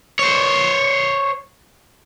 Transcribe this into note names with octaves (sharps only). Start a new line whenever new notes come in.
C5 C#5